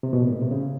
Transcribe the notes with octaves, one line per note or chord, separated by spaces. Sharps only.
C3
B2
A#2
A2
C3
C#3